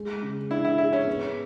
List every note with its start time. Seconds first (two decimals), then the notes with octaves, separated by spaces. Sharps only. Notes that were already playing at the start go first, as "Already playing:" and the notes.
Already playing: G#3
0.22 C#3
0.50 D4 E4
0.65 E4
0.78 E4 G#4
0.93 C#4
1.07 B3